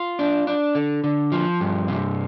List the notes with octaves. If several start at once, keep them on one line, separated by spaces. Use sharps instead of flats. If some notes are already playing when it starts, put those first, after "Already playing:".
Already playing: F4
D4
D4
D3
D3
F3
G2
C3